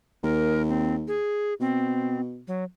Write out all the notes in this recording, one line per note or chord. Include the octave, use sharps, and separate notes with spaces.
D#2 A#4
C4
G#4
B2 C4
F#3